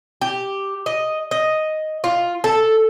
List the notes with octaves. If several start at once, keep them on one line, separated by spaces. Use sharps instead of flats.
G4
D#5
D#5
F4
A4